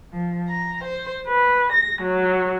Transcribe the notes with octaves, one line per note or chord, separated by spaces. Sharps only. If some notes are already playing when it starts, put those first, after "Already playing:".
F3
A#5
C5
B4
A#6
F#3